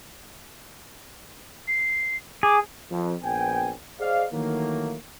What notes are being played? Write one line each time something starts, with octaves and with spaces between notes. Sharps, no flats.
C7
G#4 D6
F2
A#1 B3 G5 G#5
G#4 C5 D5 D#5 F5
D#3 E3 F#3 A3 A#3